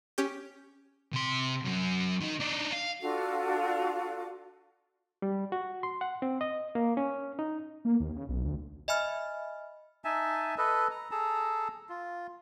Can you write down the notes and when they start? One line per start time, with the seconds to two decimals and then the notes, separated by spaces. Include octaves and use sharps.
0.18 C#4 G4
1.13 C3 C6
1.65 F#2 F#3
2.21 D#3 D#4
2.40 D4 D#4
2.73 F5
3.01 D4 F4 F#4 A4
5.22 G3
5.52 F#4
5.83 C6
6.01 F#5
6.22 C4
6.41 D#5
6.75 A#3
6.97 C#4
7.39 D#4
7.85 A#3
8.00 D#2
8.16 C#3
8.29 B1
8.45 D2
8.88 D#5 E5 G#5 B5 F6
10.05 D#4 E5 G#5 A5
10.58 A4 B4 D#5
10.91 A#5
11.11 G#4 A4 A5 A#5
11.89 F4